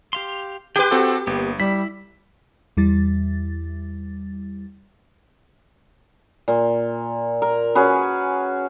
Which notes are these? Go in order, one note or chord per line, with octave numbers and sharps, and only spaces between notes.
G4 F5 C6
G4 B4 G5 C6
C4 F#4 A4
G1 A#3 B3
G3 E4 B6
E2 G3 E4 A6
A#2
A#4
C#4 F#4 G#4 B4